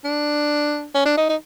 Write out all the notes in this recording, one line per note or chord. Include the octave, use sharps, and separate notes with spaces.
D4
C#4
D4
D#4
D#4